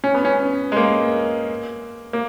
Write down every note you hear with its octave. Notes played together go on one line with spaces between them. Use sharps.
C#4
B3
C#4
G#3
A#3
A#3